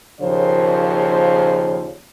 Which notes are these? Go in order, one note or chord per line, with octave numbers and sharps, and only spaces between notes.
D#2 A#2 C#3 F3 C5 C#5